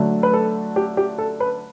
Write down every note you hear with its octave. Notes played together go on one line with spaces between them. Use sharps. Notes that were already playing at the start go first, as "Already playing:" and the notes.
Already playing: D3 F#3 A3
B4
A4
G4
G4
A4
B4